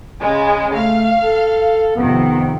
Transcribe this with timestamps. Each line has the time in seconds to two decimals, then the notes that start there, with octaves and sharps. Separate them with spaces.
0.20 C#3 G#3
0.75 A3 F5
1.23 A4
1.96 F2 C3 D#3 B3